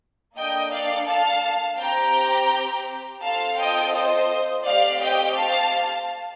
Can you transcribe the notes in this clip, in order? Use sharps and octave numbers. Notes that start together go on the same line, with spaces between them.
A#3 D4 A4 D#5 G5
D5 F5
F5 A5
C4 G4 G5 A#5
C4 F4 A4 F5 A5
D#5 G5
C5 D#5
A3 C4 G4 D5 F5
D#5 G5
F5 A5